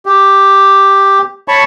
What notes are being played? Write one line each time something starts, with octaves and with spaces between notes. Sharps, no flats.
G4
C#5 A5 B5 C#6